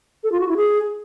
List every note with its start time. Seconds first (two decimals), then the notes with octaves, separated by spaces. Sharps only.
0.24 A4
0.32 F4
0.40 F#4
0.48 E4
0.57 G#4